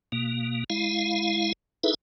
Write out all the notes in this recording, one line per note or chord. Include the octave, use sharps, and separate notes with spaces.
B2 A#3
G#3 E4 F5
D#4 E4 G#4 A4 B4 E5